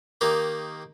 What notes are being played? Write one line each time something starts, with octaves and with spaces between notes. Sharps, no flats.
D#3 A#3 D#4 G4